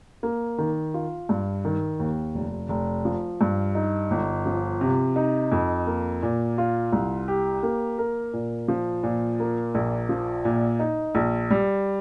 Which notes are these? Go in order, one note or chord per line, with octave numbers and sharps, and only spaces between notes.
A#3
D#3
F4
G2
D#3
D#2
F1
F1
F3
G2
D#4
G1
F3
C3
D#4
F2
A#3
A#2
F4
C2
G4
A#3
A#4
A#2
F3
A#2
A#3
A#1
F3
A#2
D#4
A#1
G3